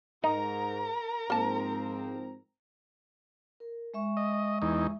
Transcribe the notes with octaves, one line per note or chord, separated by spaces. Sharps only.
G#2 D#4 A#4 A#5
G#2 F3 A#3 C4 A5
A#4
G#3 E5 C#6
D#5
E2 D#4